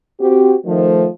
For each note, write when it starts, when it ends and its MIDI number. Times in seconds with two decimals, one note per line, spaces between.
0.20 0.55 60
0.20 0.55 66
0.20 0.55 67
0.65 1.06 51
0.65 1.06 53
0.65 1.06 57